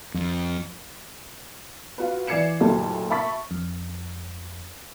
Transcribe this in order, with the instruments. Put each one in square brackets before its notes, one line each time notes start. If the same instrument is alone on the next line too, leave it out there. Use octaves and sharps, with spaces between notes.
[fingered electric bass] F2
[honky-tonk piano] F4 F#4 B4
E3 D5 G#6 C7 C#7 E7
F#1 D2 A#2 A3 G4 A5
E5 A5 B5 C#6 A6 B6
[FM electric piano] F2